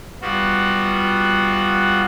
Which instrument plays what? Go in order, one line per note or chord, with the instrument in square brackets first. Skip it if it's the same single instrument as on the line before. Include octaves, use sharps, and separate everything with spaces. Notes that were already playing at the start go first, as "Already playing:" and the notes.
[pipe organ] G3 B3 F4 F#4